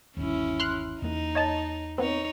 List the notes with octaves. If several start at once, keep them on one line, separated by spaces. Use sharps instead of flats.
G1 D#2 C#4 E4
C6 F6 F#6
E2 A#3 D#4
C#5 D#5 A5
B3 C4 D#4 C#5